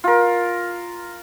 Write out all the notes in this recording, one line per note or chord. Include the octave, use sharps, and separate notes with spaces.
F4 A#4